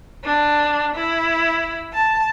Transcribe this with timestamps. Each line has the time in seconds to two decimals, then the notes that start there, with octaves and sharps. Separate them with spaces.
0.23 D4
0.95 E4
1.93 A5